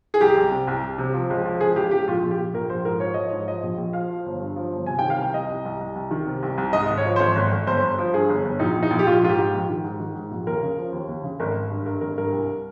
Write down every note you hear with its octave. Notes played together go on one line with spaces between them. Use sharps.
G#4
C2 G4
C2
C3
C2
C2
C3
F3
C#2
F3
C#2 G#4
C#2 G4
C#2 G4
A#1 F4
A#1
G4
A#1
A#1 A#4
A#1 C5
G#2 A#4
F3 C#5
F3 D#5
C#5
G#2
F3 D#5
A#1
A#1
F3 F5
F3
G1
G2
F3
G1
C3 G#5
D#3 G5
F5
C2 G5
C2 D#5
C2
C2
C2
C2
D#3
C3
C2
C2
G#2 D#5
G#1
C#5
F3
C5
G#1 C#5
G#1
G#1
G1 C5
G1
F3
G2 G#4
G1
G1
A#1 D#4
A#1
D#4
A#1
G4
A#1 F4
G#2 F4
G4
G#2
A#1
D#3
G#2
D#3
G#2
A#1
D#2 A#4
C#3
F3
D#2
D#2
C#3
G#1 A#4
G#1
G2
G2 A#4
G#1 A#4
G2 A#4
C2